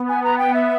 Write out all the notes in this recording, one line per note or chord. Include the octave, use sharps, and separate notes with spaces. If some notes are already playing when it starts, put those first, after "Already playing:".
Already playing: B3
G#5
A#5
G5
E5